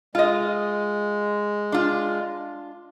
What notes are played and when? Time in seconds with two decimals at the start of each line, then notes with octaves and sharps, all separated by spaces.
0.15 G#3 F4 D#5
1.72 D4 F4